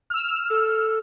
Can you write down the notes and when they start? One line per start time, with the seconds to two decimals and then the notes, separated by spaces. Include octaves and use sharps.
0.10 E6 F6
0.50 A4